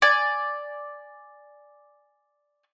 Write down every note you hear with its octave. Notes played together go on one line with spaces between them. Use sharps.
D5 G#5